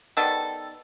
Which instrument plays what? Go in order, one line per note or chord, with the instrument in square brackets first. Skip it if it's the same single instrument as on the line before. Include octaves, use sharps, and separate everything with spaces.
[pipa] D#3 G3 B3 A4